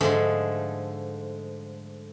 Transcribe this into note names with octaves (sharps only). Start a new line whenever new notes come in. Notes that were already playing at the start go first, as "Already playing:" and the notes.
G#2 D3 F3 A3 G#4